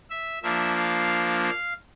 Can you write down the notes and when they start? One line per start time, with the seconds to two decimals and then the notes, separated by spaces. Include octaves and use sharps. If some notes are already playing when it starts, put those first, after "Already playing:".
0.10 E5
0.43 F3 A#3 D4 E5
0.76 F5
1.43 F5